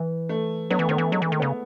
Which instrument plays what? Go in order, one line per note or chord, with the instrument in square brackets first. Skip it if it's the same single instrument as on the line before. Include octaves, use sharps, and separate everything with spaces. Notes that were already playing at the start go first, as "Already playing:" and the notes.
Already playing: [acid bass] E3
[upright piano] A3
[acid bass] F#3 [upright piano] B3
[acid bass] E3 [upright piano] A3
[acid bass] D#3 [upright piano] B3
[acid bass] E3 [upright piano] A3
[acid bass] F#3 [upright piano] G#3
[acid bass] E3 [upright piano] A3
[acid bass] D#3
[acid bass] C#3 [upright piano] B3